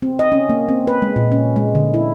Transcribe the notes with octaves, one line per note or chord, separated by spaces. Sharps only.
C4
D#5
C#4
A#3
C4
B4
G#3
A#2
C#4
G#3
D3
E4